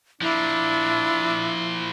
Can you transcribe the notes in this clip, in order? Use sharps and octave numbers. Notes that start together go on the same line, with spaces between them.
F3 A#3 D4 E4